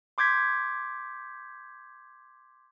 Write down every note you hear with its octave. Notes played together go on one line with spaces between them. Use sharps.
C6 D6 G6 G#6 B6